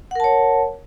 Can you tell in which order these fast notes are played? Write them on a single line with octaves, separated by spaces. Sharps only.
F#5 A#4 A5 C#5